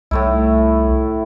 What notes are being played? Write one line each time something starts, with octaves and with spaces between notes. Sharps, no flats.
C2 A2 A3 E4